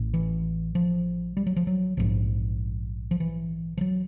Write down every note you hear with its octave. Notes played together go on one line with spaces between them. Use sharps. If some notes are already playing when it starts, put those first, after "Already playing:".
Already playing: A1 A2
E3
F3
G3
F#3
F3
F#3
A#1 G#2 F3
F3
E3
F3
F#3